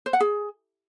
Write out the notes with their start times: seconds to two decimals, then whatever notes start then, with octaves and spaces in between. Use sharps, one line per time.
0.06 C5
0.13 F#5
0.20 G#4